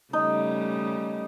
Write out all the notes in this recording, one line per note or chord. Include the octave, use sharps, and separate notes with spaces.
C#3 G3 A3 D#4